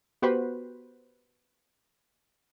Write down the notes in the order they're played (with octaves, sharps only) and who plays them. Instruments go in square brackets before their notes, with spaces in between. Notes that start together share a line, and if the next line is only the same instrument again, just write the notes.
[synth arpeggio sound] B3 F#4 G4 B4 C5